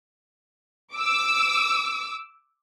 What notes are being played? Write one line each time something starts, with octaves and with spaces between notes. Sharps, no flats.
D6 E6